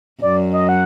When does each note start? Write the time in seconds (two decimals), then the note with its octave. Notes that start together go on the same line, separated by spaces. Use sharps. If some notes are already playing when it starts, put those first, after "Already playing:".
0.22 F#2 D5
0.53 D#5
0.69 F#5